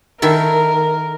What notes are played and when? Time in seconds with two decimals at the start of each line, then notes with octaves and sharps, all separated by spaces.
0.22 D#3 E4 A4 A#4